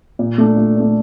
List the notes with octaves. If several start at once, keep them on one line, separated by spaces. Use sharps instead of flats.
A#2
A3 D4
A#2
A3 D4